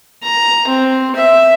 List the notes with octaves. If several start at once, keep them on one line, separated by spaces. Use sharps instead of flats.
A#5
C4
E5